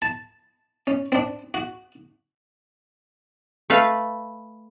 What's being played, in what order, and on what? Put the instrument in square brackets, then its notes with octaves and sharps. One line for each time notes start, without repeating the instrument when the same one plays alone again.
[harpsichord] A5
C#4
C4 D4
F#4
[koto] A3 B4 F5